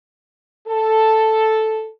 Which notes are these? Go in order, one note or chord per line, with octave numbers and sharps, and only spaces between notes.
A4